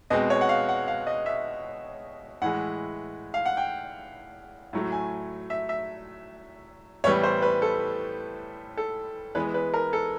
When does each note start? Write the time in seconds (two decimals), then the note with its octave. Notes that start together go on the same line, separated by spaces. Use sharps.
0.10 B2 G#3 C4 D#5
0.30 C#5
0.41 F#5
0.49 F5
0.69 F#5
0.88 F5
1.07 D#5
1.26 E5
2.42 A2 E3 G#3 F#5
3.34 F5
3.46 F#5
3.57 G5
4.73 A2 F#3 A3
4.92 G#5
5.50 E5
5.69 E5
7.04 A2 E3 G3 B3 C#5
7.23 C5
7.42 B4
7.62 A4
8.77 A4
9.35 E3 G#3 B3 B4
9.54 B4
9.74 A#4
9.93 A4